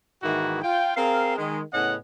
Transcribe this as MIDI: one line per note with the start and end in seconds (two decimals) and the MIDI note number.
0.23 0.60 44
0.23 0.60 51
0.23 0.60 52
0.23 0.60 58
0.23 0.60 64
0.23 0.60 66
0.62 0.92 65
0.62 0.92 79
0.97 1.36 60
0.97 1.36 68
0.97 1.36 70
0.97 1.36 77
1.37 1.61 51
1.37 1.61 56
1.73 1.96 45
1.73 1.96 49
1.73 1.96 59
1.73 1.96 61
1.73 1.96 75
1.73 1.96 78